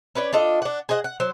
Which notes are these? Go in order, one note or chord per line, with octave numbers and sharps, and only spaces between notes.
C#4 B4 C#5 D5
D4 F4 A4 D#5
D4 F#5
G#4 C5 D#5 F#5
F#5
F#3 C5